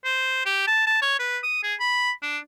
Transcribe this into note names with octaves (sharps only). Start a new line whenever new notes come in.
C5
G4
A5
A5
C#5
B4
D#6
G#4
B5
D4